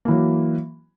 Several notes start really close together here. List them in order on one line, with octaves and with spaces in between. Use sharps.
A#3 E3 F#3